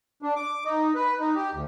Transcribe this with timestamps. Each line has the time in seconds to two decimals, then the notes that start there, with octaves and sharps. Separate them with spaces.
0.22 D4
0.36 D6
0.65 D#4
0.95 B4
1.20 D#4
1.35 G4
1.53 D2